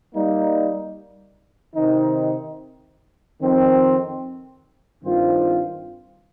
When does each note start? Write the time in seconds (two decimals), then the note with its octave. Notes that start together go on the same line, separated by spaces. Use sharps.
0.11 G3 A#3 D#4
1.75 C3 D#3 C4 D#4
3.38 F2 D#3 C4
5.02 G2 D#3 C4 F4 C5